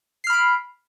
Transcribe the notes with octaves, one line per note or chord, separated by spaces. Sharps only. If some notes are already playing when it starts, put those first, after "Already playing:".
B5 F6 C7 D7